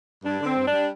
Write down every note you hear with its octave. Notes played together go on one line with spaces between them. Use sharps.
G2 D4
D3 C4
G2
D4
G3